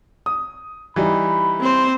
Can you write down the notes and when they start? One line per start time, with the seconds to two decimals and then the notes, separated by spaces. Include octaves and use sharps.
0.26 D#6
0.96 E3 G3 D#4 B5
1.60 C4 C5